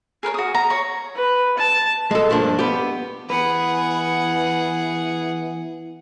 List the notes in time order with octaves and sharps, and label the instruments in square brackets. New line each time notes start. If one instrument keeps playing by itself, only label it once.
[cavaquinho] G#4 A#4 B4 C#5
F#4 D#6
A#5
C#5 C#6
[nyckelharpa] B4
A5
[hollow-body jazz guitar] G#3 A4
G2 F3 A#3 D4
B3 G4
[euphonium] E3 [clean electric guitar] B3 B4 [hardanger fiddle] G#4 F#5